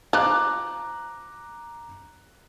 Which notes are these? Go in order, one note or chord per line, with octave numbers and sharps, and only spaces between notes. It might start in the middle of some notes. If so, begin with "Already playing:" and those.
F3 A#5 D6 F#6